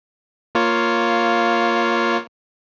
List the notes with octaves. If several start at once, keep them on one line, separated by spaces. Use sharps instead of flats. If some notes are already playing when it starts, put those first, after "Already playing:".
A#3 F4 C#5